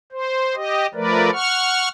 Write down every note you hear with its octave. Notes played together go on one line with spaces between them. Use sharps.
C5
G4 D#5
F3 A3 A#4 B4 D5
F#5 C#6 F6